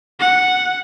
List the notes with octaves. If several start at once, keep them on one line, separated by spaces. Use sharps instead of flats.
F#5